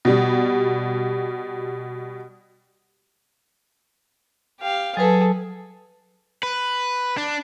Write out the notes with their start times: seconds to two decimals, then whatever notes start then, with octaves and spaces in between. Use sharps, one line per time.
0.05 B2 G3
4.61 G4 F5
4.97 F#3 G#4 A4 B4
6.43 B4
7.17 D4